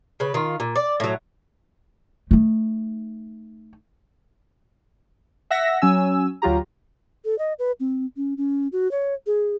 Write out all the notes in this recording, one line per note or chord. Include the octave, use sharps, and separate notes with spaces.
C#3 B4
D#3 F4
A#2
D5
A2 F#3
A3 D#4
E5 F#5 E6 A#6 B6
F#3 C#4 G#5 E6
D2 F#3 F4 G4 A#5
A4
D#5
B4
C4
C#4
C#4
F#4
C#5
G#4